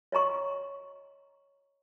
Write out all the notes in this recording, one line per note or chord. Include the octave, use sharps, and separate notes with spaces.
C#5 D#5 A#5 C#6